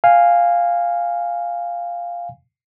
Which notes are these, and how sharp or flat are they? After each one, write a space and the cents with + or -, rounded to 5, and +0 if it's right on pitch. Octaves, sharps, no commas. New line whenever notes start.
F5 +0 G#5 -15